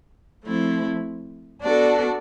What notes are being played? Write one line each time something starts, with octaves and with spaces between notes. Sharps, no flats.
F3 A3 C4 E4
B3 D4 F#4 A4 D5